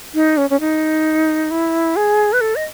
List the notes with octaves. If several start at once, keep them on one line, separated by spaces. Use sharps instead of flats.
D#4
C#4
C#4
D#4
E4
G#4
B4
A4
D#5